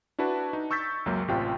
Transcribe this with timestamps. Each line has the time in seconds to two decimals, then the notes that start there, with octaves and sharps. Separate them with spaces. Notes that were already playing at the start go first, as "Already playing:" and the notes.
0.19 D4 E4 F#4 B4 A5
0.53 D#4
0.71 C#6 E6 G6 A6 B6
1.06 C#2 F#2 F#3 A#3
1.28 A1 C3 F4 G5